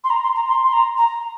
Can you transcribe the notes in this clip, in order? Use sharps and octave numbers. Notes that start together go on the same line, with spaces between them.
C6
A#5
C6
A#5
C6
C6
A#5
A#5